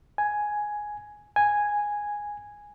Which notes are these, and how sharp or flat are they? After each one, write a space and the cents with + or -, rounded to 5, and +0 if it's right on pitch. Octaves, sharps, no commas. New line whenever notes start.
G#5 +5
G#5 -5